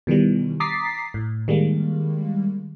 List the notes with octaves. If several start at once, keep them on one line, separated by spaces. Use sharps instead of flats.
B2 D#3 E3 G3
A#5 D6 D#6 A6 B6 C7
A2
D#3 G3 G#3 A#3